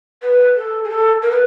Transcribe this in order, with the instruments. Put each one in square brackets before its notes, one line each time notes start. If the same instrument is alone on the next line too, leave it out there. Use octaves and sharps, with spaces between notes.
[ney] B4
A4
G#4
A4
A#4
B4